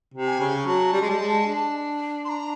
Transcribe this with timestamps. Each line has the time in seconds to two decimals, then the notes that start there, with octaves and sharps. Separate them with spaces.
0.14 C3
0.27 G#5
0.40 C#3
0.66 F#3 A5
0.93 G3
1.01 G#3
1.10 G3
1.20 G#3
1.46 D4
2.25 C6
2.29 A#5